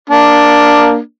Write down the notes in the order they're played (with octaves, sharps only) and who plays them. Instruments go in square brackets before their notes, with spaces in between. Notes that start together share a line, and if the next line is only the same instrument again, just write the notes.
[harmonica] A#3 D4